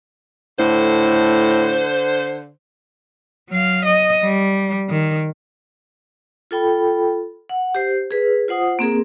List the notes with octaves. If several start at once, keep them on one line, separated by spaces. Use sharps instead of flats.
A2 D3 C5
F#3 F5
D#5
G3
D#3
F4 A4 G5 B5
F#5
G4 C5
G#4 B4
F4 C5 F#5 D#6
A#3 C4 G#4 A#4